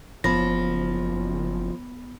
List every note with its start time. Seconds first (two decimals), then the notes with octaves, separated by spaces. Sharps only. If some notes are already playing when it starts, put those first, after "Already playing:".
0.24 F#1 F3 B3 B5 A#6